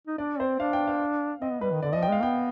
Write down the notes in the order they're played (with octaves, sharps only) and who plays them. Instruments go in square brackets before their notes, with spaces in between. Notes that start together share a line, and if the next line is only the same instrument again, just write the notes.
[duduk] D#4
[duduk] D4 [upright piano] D5
[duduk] C4 [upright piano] C5
[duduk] D4 [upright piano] F5
[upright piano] G5
F5
[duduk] C4 [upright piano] D#5
[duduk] B3
[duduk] G3 [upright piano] B4
[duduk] D#3
[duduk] D3 [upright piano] D5
[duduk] F3 [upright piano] D#5
[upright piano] G5
[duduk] G#3 [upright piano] F5
[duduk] B3 [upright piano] G5